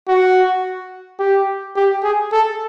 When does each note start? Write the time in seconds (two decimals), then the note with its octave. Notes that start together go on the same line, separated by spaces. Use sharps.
0.08 F#4
1.20 G4
1.76 G4
2.04 G#4
2.32 A4